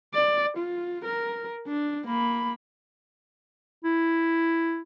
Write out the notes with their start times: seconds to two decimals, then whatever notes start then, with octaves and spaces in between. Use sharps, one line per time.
0.14 D5
0.57 F4
1.05 A#4
1.68 D4
2.07 A#3 B5
3.84 E4